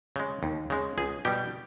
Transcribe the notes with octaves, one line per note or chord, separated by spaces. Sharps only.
C#3 G#3
D#2
C#3 G#3
C#2 G#4
B2 G3 G4